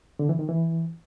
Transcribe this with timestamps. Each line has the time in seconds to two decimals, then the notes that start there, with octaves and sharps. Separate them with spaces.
0.19 D3
0.29 E3
0.39 D#3
0.49 E3